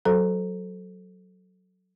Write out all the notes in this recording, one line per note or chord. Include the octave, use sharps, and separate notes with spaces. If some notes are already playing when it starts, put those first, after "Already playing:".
F#3 F#4 A4 C5 A#5